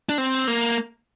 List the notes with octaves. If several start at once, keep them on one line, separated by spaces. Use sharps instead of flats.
D4
C4
A#3